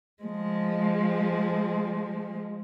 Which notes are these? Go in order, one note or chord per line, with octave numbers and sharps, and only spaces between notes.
F3 G#3